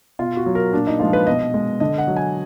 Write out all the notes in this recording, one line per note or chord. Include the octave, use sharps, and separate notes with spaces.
B2 F4
F#4
F#3
A#4
A#2 D4
D#4
F3 G#3 F4
B4
B2 D#5
G#3
D3 D#5
F#5
F#3
G#5